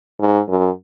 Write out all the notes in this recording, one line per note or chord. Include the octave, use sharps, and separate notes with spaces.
G#2
F#2